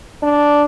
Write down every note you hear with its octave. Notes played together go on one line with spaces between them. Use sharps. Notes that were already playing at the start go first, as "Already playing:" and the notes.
D4